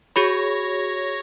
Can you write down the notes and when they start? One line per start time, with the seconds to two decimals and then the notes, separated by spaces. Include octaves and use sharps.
0.16 F#4 G#4 C#5 B5 C#6 A#6